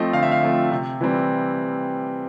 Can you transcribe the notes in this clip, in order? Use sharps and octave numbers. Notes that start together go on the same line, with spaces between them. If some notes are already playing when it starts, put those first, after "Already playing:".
Already playing: F3 A3 C4 D#5
D3 F5
E5
F5
F3 A3 C4
C3
E3 G3 C4